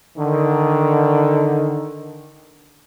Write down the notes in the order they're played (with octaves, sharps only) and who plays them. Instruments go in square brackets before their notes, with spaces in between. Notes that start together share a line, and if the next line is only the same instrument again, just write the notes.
[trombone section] D3 D#3